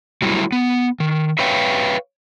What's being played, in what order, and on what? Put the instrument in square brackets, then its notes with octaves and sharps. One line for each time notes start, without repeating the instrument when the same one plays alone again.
[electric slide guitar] F#3 G3 A3 E4
B3
D#3
B4 C#5 E5 F5 G5